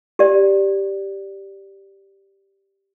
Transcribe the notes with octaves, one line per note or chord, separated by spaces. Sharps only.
G4 D5